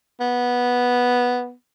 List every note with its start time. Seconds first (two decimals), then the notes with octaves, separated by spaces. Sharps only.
0.20 B3